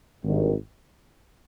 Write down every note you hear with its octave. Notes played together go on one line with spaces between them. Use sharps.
G#1 G2 D#3